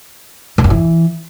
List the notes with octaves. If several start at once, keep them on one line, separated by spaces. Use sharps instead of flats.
G2
F#2
E3